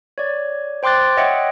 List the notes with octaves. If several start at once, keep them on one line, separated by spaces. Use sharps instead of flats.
C#5 D5
C5 G5 C6 D6 F#6 A6
C#5 D#5 E5 F#5 G5